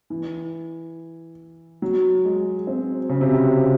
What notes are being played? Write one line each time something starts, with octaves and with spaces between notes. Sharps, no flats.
E3
F#3
G#3
C4
C#3
C3
C#3